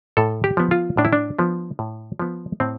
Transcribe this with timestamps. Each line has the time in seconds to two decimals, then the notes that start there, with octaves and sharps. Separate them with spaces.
0.17 A2 A4
0.44 G4
0.57 F3 B3
0.71 F4
0.97 A2 D4
1.05 E4
1.13 D4
1.39 F3 B3
1.79 A2
2.19 F3 B3
2.60 A2 C4